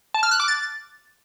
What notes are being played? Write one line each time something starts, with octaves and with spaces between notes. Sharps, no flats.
A5
F6
F#6
D6
A6